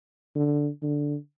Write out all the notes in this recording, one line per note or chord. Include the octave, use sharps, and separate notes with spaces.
D3
D3